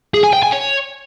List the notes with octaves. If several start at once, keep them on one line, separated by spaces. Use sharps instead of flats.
G#4
G#5
G5
G#5
C#5